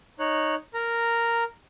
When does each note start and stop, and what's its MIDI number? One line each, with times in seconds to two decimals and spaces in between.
0.19 0.55 63
0.19 0.55 73
0.19 0.55 90
0.74 1.44 70
0.74 1.44 82